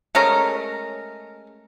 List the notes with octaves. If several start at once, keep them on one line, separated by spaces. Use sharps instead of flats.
G#3 A3 C#4 A#4